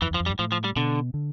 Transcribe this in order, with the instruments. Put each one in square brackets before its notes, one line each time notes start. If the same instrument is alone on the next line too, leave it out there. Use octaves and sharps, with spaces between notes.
[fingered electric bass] F2 [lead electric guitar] E3
[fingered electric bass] E2
[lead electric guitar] F3
[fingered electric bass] F2
[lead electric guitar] G3
[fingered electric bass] G2
[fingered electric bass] A2 [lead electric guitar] F3
[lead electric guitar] F3
G3
[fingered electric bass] B2 [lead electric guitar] D3
[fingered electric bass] D3